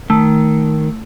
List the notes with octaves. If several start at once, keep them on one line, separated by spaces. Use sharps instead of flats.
D#3 A3